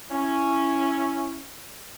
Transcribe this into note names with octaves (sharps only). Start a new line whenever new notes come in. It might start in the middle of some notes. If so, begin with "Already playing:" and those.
C#4 E4